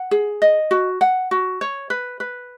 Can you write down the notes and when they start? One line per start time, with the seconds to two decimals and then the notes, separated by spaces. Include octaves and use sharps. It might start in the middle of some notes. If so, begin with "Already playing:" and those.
Already playing: F#5
0.11 G#4
0.42 D#5
0.71 F#4
1.01 F#5
1.31 F#4
1.61 C#5
1.90 B4
2.20 B4